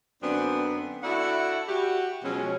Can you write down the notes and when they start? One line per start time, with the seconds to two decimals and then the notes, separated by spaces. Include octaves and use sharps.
0.23 F#2 D3 B3 C4 D4
1.04 E4 F#4 A4 D5 E5 F#5
1.68 F#4 G4
2.24 B2 F3 F#3 G#3 C#4